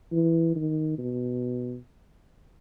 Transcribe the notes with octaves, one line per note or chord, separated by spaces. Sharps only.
E3
D#3
B2